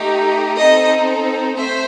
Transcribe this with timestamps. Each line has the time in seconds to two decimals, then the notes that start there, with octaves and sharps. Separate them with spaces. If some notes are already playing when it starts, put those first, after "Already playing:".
Already playing: A3 D#4 G4
0.58 C4 D#4 A4 D#5
1.56 A3 C4 C5 E5